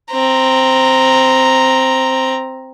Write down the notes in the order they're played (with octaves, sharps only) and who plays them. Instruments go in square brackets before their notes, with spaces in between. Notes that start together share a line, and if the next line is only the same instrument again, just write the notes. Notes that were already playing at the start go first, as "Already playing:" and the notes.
[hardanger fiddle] C4 A#5